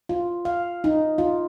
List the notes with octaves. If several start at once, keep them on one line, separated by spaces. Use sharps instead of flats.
F4
F5
D#4
F4